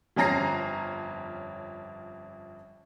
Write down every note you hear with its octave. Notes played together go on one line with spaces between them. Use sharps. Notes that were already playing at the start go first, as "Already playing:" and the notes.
G1 F2 C#4 A#5 A#6 C7